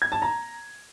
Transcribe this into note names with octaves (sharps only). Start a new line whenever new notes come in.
G#6
A5
A#5